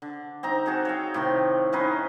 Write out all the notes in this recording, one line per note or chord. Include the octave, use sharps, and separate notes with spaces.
D3
C4 D#4 A#5
F#4 G#4 A4
C#5 F5 G5
A2 C3 D#3 C6
C#4 D#4 B4 C5